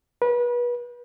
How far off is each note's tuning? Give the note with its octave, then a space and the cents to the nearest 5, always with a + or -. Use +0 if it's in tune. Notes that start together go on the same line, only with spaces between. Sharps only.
B4 -30